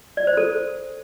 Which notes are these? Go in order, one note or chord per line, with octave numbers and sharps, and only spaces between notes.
D5
C5
A4